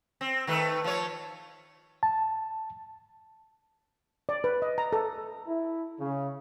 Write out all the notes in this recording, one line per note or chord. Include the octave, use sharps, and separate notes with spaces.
C4
D#3 A3 B4
F3 C#5
A5
D5
B4
D#5
A#5
A4
E4
C#3